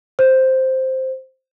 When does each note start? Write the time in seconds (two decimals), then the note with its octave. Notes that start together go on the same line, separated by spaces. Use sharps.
0.19 C5